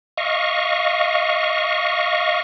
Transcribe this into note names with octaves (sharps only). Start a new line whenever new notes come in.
D#5 F5 C#6